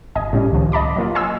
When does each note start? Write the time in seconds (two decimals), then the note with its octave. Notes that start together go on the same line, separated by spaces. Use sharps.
0.15 G1 D#5 G#5
0.33 A2 G3 C#4
0.51 C#2 D#3 F3
0.72 D#5 A5 B5 D6
0.96 F#3 A#3 F4
1.15 D#5 G#5 C6 E6